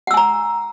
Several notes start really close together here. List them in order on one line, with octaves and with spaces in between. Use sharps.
F#5 E6 G#5 A#5